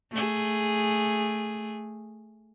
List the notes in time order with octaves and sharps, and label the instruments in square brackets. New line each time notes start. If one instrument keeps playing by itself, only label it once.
[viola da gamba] A3 G#4